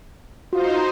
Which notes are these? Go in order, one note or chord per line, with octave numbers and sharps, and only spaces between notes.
D#4 F4 F#4 C5